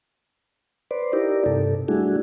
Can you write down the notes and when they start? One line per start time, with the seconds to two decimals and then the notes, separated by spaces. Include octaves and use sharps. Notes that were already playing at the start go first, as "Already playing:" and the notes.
0.91 B4 C5 D5
1.13 D#4 E4 G4 A#4 D5
1.46 G2 C3 A4
1.88 G3 A3 D4 E4 F#4 G#4